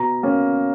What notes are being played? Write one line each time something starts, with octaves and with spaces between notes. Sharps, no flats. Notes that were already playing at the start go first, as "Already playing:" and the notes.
Already playing: B2 A#5
A#3 C#4